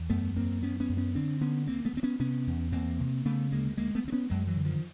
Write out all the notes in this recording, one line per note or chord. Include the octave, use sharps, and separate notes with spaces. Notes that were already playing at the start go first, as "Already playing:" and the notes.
Already playing: E2
F#2 A3 B3
F#2 A#3 C4
F#2 B3 C#4
B3 C#4
F#2
B3 C#4
D3 C4 D4
D3 B3 C#4
D2 A#3 C4
A3 B3
D2 C4
B3 C#4
C3 B3 C#4
E2
E2 A#3 C4
C3
C#3 A3 B3
D2 G#3 A#3
D2 G#3 A#3
A3 B3
D2
C4
B3 C#4
F#2 F#3 G#3
E3 F#3
D3
D#3 F3